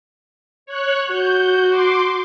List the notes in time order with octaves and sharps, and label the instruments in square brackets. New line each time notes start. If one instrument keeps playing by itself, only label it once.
[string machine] C#5 F#6
[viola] F#4 [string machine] G6
[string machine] C6 D6